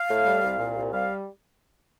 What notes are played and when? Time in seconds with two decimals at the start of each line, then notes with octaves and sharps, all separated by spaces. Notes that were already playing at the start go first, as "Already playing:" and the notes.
Already playing: F5
0.09 A2
0.25 G3
0.43 C2
0.59 A#2
0.76 C2
0.92 G3 F5